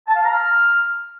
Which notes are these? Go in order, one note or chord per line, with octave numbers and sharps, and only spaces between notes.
A5
F5
A#5
F6